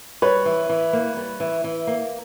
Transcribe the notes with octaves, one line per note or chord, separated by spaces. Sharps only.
G3 B4 C#5
E3
E3
A#3
G3
E3
E3
A#3